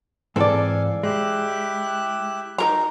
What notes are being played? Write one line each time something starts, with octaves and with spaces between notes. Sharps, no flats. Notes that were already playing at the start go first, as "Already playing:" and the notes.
G#2 E3 C4 A4 D5 F5 G#5
G#3 E4 G4 F#6
D#4 A#4 A#5